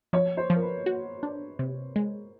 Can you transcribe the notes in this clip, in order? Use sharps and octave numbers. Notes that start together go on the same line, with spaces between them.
F3 C#5
C5
F3
A#4
B4
F#4
D4
C3
G#3